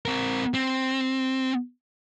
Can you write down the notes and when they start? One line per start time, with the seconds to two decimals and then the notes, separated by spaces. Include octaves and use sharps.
0.06 C4 A#4
0.54 C4